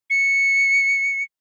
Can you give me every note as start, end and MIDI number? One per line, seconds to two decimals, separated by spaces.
0.10 1.23 97